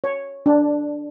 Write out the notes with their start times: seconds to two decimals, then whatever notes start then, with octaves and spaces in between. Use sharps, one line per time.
0.04 C#5
0.46 D4